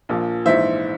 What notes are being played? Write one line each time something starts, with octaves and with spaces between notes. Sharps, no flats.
A#1 A#2 F3
A#1 G#2 E3 C5 E5